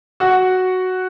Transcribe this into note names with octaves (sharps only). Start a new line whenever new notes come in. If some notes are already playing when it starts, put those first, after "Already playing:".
F#4 F#5